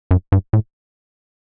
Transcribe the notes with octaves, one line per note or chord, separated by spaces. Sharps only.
F#2
G2
A2